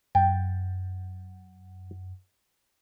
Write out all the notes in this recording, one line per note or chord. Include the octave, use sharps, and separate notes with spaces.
F#2 G5